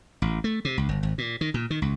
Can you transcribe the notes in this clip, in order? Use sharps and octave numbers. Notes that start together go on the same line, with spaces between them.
A1
A3
C3
C#2
G1
G#1
A#2
D#3
A#2
D#3
C#2